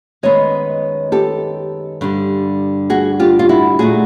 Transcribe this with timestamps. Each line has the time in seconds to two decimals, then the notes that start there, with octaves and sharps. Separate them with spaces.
0.23 F#2 D#3 G#3 B3 C#5 D#5
1.12 G4 A4
2.01 G2 D3 G3
2.90 F#4 G#4
3.20 F4 G4
3.39 F4
3.49 E4 F#4
3.79 A#2 F#3 A3 F#4 G#4